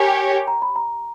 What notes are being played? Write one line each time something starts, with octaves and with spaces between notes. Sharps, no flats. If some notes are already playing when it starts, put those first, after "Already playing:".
Already playing: G4 A#4 C#5 G#5
A#5
B5
A#5